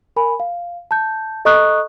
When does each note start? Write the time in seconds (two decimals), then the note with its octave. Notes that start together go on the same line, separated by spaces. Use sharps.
0.16 A#4 G#5 B5
0.40 F5
0.91 A5 G6
1.45 A4 D#5 A#5 C#6 D#6 F#6